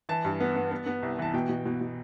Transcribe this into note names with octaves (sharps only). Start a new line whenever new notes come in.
E3 A5
G2
B3
B3
B3
B3
C2
E3 A5
B2 G5
B2
B2
B2